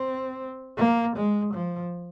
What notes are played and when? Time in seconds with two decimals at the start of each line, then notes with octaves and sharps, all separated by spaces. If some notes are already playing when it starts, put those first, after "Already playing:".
Already playing: C4
0.78 A#3
1.16 G#3
1.53 F3